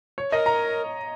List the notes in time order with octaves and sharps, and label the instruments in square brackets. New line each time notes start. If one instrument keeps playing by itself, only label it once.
[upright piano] C#5
[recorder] A#4 [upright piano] D#5
[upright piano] A#5